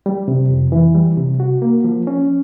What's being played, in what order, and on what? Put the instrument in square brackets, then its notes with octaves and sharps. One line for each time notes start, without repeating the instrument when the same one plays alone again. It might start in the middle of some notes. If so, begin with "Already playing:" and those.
[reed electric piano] G3
C3
F2
E3
G3
C3
F#4
A#3
F3
C#4